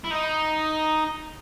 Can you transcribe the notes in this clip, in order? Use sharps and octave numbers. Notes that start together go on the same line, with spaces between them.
E4
D#4